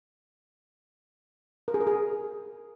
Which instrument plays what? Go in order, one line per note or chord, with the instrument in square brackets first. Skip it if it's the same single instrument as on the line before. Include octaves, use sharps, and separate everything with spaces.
[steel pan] A#4
G#4
A#4
G#4